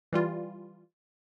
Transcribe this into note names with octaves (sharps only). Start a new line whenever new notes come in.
E3 G3 F4